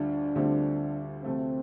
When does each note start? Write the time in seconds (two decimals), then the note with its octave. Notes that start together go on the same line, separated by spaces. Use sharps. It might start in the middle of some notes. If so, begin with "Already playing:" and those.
Already playing: D2 D3 G3 D4 F4
0.35 D2 D3 G3 C4 F4
1.24 D2 C3 F3 A3 C4